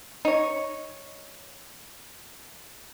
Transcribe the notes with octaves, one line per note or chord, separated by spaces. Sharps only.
D#4 C#5